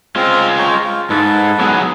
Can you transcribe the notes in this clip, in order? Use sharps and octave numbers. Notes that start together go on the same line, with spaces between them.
G#3 C4 F4
C#5 G5 A#5
F4
G#2 A4 B4
F#3 B3 G#4